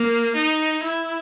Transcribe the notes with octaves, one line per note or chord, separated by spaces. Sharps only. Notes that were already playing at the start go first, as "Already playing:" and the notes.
Already playing: A#3
D#4
E4